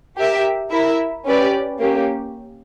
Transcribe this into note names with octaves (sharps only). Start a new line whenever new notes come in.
G4 A#4 E5
E4 A#4 E5
C#4 G4 B4 D5
A#3 C#4 G4